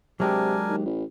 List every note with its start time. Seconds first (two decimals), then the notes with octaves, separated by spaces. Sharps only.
0.20 C3 F#3 G#3 D4 G4 A#4 G#5
0.69 D#2
0.86 A1